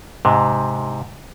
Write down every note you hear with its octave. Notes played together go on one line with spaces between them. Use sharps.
G#2 C3